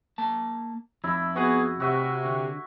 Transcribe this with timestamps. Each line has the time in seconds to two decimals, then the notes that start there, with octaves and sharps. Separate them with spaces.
0.18 A#3 A5
1.04 F2 E4 E5
1.36 B3 F#4 G#4
1.80 C3 F#4 E5
2.25 D3